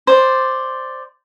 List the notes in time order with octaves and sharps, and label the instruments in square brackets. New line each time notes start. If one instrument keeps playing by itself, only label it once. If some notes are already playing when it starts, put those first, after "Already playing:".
[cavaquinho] C5 D5